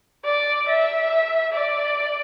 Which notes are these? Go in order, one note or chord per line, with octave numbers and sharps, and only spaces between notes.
D5
E5
D5